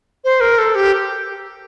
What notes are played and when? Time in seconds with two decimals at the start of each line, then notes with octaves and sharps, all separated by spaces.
0.24 C5
0.40 A#4
0.58 A4
0.75 G4